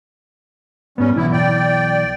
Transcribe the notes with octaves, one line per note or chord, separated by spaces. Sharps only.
G#2 G3 B3 C#4
B1 E3 B3 E4
D5 G5